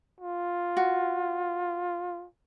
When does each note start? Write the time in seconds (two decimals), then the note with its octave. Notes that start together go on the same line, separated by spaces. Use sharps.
0.21 F4
0.77 F#4